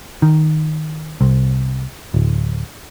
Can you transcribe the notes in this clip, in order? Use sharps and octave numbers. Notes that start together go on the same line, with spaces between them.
D#3
C2
D1